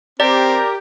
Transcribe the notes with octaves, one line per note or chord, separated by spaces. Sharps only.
C4 G4 A#4 D5 A#5